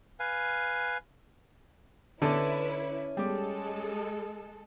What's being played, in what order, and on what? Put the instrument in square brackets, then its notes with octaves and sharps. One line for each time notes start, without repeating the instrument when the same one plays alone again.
[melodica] B4 F5 G#5
[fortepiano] D3 [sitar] C#4 D5 [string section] E4 B4
[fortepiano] G3 G4 [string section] G#3 A4